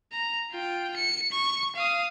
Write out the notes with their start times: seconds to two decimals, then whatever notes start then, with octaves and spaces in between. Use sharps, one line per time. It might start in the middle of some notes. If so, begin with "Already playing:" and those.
0.12 A#5
0.51 F4 G5
0.96 C#7
1.32 C#6
1.75 F5 D#6